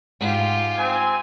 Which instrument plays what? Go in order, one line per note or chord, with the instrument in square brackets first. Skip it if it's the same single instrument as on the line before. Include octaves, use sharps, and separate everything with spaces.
[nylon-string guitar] G#2 F#5 [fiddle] F4 G4
[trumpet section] C4 G#5